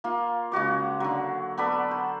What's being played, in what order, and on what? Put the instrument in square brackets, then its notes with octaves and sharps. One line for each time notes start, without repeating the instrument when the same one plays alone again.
[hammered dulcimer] A#3 F4
C#3 G#3 F#4 D6
D3 F#3
B3 A4 D5 B5
C5